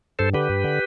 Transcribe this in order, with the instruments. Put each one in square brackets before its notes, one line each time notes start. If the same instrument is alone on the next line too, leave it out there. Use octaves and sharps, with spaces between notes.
[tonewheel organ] G2 A4 C5
D3 G4 B4
G2
D3